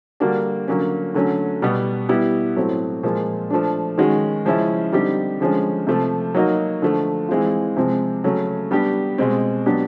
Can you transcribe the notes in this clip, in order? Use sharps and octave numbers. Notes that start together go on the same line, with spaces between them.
D3 G3 A#3 D4 F#4
D3 F#3 A#3 C#4
D3 F#3 A3 C#4
B2 G3 B3
G3 B3 E4 G4
A2 F#3 A3 C4
A#2 F3 G#3
F3 A3 D4
D#3 G#3 C#4 F#4
C#3 F3 G#3 C#4 E4
D3 G3 C4 D#4 G4
D3 F3 G#3 C#4
C3 F3 A3
F#3 A#3 D#4 F#4
D3 F3 A3
E3 G#3 C4 F4
C3 F3 G#3 C4
C#3 F#3 A3 C#4
G3 B3 D4 G4
B2 G#3 C4
F#3 B3 D4 G4